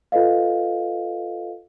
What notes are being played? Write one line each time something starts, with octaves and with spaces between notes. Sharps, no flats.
F4 A4 B4 D#5 F5